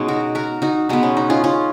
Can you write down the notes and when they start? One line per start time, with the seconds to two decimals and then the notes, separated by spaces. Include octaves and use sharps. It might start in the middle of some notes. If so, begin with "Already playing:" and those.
Already playing: B2 G#3 C#4 D#4
0.08 F#4 A#4
0.35 F#4 A#4
0.62 D#4 F#4
0.89 B2 G#3 B3 D#4
1.03 C#4
1.17 D#4
1.30 C#4 F4
1.44 C#4 F4